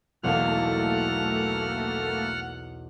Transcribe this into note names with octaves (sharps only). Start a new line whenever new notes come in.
B1 E2 A3 A#3 A4 F5 F#5 F6